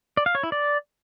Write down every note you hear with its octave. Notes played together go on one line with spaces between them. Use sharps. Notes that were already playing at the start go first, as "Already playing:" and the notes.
D5
F5
C#5
E4
D5